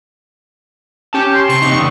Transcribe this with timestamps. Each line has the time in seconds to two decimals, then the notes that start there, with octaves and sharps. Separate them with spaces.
1.14 C#4 G4 A5
1.35 C6
1.49 C3 C#6
1.62 D#4 G4 C#6
1.73 E2 C#3